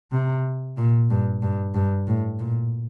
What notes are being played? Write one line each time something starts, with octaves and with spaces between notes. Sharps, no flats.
C3
A#2
G2
G2
G2
A2
A#2